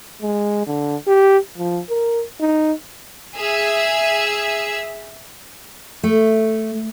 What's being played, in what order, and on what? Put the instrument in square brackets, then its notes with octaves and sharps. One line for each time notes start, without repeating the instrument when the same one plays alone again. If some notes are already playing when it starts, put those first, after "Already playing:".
[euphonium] G#3
D3
G4
F3
A#4
D#4
[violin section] G#4 E5 E6
[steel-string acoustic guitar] A3